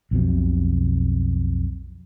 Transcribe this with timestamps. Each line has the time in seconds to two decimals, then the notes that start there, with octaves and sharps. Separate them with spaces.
0.11 B1 F2 B2